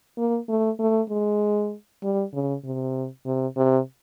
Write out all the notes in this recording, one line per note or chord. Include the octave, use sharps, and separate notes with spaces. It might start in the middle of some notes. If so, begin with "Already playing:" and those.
A#3
A3
A3
G#3
G3
C#3
C3
C3
C3